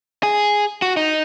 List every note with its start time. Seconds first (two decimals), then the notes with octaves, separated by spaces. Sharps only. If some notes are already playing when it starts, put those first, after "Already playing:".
0.23 G#4
0.82 F#4
0.97 D#4